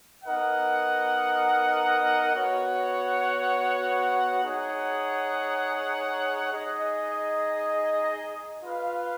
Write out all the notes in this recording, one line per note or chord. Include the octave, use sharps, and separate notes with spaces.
B3 D#4 A#4 D#5 F#5
B3 F#4 C#5 F#5
D#4 G#4 C#5 F#5
D#4 G#4 D#5
F4 B4 F5